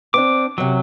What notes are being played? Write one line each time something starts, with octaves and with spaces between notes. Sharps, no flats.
B3 C4 D4 D6
F#2 C3 F#3